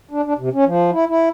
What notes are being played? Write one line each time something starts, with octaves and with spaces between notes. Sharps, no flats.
D4
D4
C3
C#4
F3
E4
E4